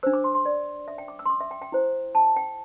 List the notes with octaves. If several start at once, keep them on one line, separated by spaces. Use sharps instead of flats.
D4 C5 E6
D6
C6
C6
D5
E5
G5
D6
E6
C6
D6
E5
G5
G5
E4 C5
A5
A5
G5